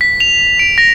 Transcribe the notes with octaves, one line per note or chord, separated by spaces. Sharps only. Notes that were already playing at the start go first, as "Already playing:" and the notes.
B6
F7
D7
A#6